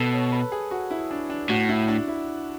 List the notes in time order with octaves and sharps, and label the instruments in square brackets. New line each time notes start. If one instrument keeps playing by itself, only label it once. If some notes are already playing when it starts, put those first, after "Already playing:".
Already playing: [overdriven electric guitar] B2 [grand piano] A4
[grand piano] C#5
B4
G#4
F#4
E4
D4
D4
[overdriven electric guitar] A2 [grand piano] F#4
[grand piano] E4
D4
E4